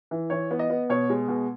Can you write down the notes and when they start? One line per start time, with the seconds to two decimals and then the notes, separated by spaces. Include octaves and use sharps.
0.11 E3
0.30 E3 C#5
0.51 B3
0.59 D#5
0.70 B3
0.90 B2 C#5
1.10 G#3
1.28 B2